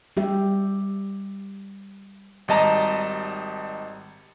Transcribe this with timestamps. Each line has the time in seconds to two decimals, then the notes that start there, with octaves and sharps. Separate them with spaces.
0.17 G3 G4 E5
2.48 G#1 G3 D#5 A5 A#5